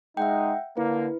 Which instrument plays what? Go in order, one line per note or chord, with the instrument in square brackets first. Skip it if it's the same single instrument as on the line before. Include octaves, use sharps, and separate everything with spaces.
[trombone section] G#3 D#4 [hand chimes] E5 F#5 G5
[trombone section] D3 A#3 [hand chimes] E4 B4